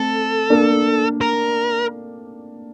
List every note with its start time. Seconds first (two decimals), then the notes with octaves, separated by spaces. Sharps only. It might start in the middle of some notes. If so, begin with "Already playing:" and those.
Already playing: A3 C4 A4
0.50 A#3 D4
1.21 A#4